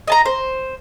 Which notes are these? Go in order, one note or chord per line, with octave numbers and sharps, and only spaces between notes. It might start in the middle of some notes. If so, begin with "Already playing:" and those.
D#5 A5 A#5
C5